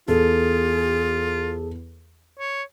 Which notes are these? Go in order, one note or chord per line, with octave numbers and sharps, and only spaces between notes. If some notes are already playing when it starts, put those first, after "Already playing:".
E2 F4 G#4 A4
C#5